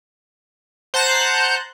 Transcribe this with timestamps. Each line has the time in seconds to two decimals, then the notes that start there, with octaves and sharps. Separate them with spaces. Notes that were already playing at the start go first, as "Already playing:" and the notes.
0.94 C5 F#5 A5 A#5 F#6 G6